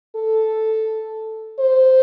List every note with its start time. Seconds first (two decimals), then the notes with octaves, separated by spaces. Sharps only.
0.16 A4
1.59 C5